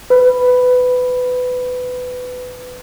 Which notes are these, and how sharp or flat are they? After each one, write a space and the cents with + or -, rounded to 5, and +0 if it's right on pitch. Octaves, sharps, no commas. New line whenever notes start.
B4 +20 B5 +0